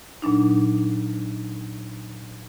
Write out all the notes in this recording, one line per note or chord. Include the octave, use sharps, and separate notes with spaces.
A#2 F#3 D4 D#4